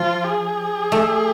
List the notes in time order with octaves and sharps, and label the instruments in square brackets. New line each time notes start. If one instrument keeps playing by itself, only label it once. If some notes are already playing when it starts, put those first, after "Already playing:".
Already playing: [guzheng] F3 [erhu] F4
[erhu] G#4
[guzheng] A3